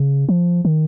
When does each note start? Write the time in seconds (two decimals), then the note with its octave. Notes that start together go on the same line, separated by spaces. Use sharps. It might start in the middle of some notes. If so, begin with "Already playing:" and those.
Already playing: C#3
0.29 F3
0.65 D#3